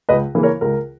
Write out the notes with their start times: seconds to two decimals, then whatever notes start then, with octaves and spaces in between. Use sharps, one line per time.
0.09 C#2 B4 D#5
0.35 C#3 E3 A#3
0.43 A#4 C#5
0.61 C#2 A#4